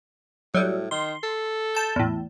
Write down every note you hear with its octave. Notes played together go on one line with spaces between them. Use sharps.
A2 F#3 G3
D#3 C6
A4
A5 G6
E2 A2